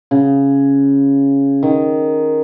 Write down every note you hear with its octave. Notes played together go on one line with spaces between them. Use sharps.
C#3
D#3